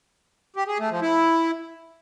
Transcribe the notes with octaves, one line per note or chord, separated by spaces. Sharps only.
G4
G#4
A3
F3
E4